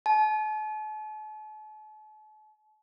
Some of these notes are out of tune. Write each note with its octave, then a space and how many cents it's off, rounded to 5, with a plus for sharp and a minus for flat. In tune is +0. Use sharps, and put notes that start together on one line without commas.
A5 -45